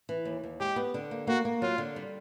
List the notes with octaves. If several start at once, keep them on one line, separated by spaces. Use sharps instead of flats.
E3
D#2
D#2
G#3 G4
B3
D3
A#3
A#3 F#4
A#3
F#3 F4
D3
G3